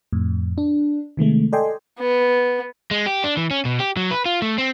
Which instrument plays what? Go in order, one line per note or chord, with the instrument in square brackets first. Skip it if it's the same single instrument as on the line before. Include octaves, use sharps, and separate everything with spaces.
[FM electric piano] F2 A2
D4
C3 D#3 G#3 A3
A4 D5 D#5 G5 G#5 C6
[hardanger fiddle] B3
[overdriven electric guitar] G#3
G4
D4
E3
C#4
B2
G4
F#3
B4
F4
A3
C4